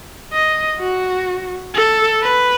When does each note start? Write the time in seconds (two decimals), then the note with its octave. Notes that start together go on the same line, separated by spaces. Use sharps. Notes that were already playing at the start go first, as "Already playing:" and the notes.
0.33 D#5
0.80 F#4
1.75 A4
2.23 B4